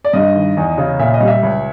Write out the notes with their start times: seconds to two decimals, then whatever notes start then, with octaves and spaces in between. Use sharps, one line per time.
0.05 D5
0.13 G2 D#5
0.35 D#3
0.57 E2
0.78 C#3
0.99 A#2 E5
1.14 D#5
1.20 G3
1.27 E5
1.43 C#2